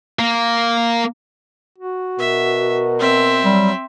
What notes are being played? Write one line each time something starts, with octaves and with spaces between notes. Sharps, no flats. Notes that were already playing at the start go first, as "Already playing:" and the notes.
A#3
F#4
B2 A#4 E5
C4 E5
F#3 G3